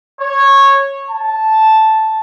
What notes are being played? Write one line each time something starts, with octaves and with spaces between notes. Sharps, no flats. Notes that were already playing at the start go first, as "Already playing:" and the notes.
C#5
A5